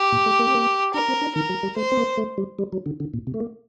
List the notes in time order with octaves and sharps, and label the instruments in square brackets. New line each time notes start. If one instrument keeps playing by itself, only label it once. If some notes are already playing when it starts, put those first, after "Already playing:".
Already playing: [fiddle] G4
[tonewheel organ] A#2
A3
A#3
C4
A#3
[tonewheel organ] D4 [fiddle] A#4
[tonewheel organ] C4
D4
[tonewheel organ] D#3 [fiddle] A#4
[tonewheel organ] F#3
G3
[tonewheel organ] A3 [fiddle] C5
[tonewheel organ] C4
A#3
A3
G3
G3
F#3
D3
D3
A#2
C3
A3
A#3